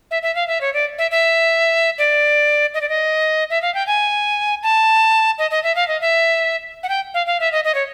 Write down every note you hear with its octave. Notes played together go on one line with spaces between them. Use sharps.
E5
E5
F5
E5
C#5
D5
E5
E5
D5
D#5
D5
D#5
E5
F5
G5
G#5
A5
D#5
D#5
E5
F5
D#5
E5
F#5
G5
F5
F5
E5
D#5
D#5
C#5